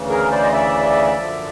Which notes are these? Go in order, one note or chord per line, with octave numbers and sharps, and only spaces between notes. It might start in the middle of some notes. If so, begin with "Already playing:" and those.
Already playing: D2 C#3 E3
G#4 A#4
C5 D5
D#5
D5 E5
F#2 D3 F3